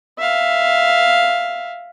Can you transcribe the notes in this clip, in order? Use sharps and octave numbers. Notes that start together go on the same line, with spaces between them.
E5 F5